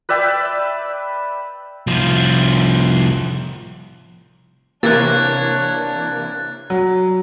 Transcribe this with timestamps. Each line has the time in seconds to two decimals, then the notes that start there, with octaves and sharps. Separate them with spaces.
0.09 B4 D5 E5 G5
1.87 C2 F3
4.83 C3 E3 A#3 D4 C#5 F#6 G#6 A6
6.70 F#3